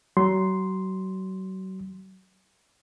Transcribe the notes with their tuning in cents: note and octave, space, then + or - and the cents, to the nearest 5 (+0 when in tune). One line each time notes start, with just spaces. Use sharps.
F#3 +35 C6 +0